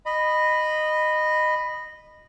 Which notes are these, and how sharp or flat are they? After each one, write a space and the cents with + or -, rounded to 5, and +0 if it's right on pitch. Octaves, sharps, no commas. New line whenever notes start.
D#5 -15 B5 +0